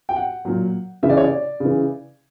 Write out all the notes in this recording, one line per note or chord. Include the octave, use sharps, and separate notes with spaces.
G5
F#5
A#2 F#3
C#3 E3 E5
D5
C#5
D5
C#3
E3